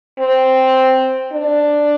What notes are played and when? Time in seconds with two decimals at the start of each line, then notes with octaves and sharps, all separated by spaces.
0.20 C4
1.32 D4